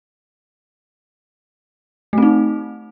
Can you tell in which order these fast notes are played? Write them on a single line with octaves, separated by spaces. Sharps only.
A3 C4 D#4